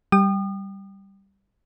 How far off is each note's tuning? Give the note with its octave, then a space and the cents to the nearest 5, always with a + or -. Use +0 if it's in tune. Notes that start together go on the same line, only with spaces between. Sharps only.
G3 +0 G5 +0 D#6 -40